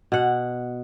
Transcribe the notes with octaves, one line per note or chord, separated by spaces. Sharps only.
B2 F#5